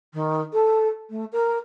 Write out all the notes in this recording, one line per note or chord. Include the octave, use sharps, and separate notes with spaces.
D#3
A4
A3
A#4